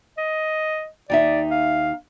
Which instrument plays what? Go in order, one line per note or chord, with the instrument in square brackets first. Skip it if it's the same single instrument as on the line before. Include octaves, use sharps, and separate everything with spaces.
[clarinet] D#5
[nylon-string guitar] D#2 D#4 E5 [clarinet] D5
[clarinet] F5